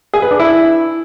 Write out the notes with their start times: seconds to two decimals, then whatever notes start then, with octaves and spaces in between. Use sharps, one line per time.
0.14 G#4
0.22 B4
0.31 D4
0.40 E4